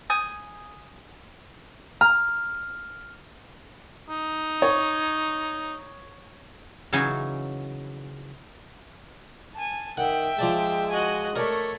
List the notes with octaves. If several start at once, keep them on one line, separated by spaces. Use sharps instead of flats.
G#5 D#6 G6
A#5 F6
D#4
C#5
C#3 E3 F#3 D#4 G#4 G#5
G#5 A5
D#3 E5 F#5 G5
F3 G#3 D5 A5
F#4 D#5 G#5 F#6
A3 A#4 C#5 D5